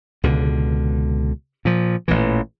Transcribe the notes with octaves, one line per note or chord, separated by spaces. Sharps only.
C#2 B2 D3
A#2 F3
A1 A#2 E3